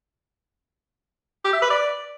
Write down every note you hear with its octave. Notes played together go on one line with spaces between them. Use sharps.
G4
E5
B4
D5